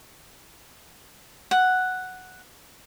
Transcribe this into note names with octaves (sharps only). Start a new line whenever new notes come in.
F#5